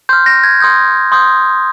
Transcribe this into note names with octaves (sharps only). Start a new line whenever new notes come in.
C6 F6 G6
A#6
G#6
C6 D#6 G6
C6 D#6 G6